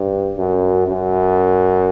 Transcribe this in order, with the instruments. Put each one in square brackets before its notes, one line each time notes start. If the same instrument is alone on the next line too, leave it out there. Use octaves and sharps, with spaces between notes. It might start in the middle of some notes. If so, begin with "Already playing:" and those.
Already playing: [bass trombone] G2
F#2
F#2